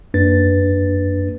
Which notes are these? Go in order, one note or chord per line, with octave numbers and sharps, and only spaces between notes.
F#2 A#3 D4 B4 A6